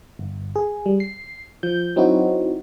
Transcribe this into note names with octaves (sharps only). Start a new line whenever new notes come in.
G1
G#4
G3
C7
F3 G6
F#3 C4 D#4 E4 F#4